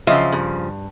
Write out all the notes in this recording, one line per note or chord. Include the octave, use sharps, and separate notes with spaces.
C#3 F3 F#3 D#5 E5
G2